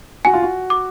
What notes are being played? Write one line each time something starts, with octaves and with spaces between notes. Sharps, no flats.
F#4 G#5
F4
F#4
D6